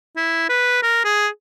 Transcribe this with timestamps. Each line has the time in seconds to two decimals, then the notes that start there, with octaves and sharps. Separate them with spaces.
0.16 E4
0.49 B4
0.83 A#4
1.04 G#4